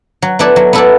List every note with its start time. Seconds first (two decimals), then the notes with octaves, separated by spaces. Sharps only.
0.22 F#3
0.39 B3 E4 A4 D5
0.56 F#3
0.73 B3 E4 A4 D5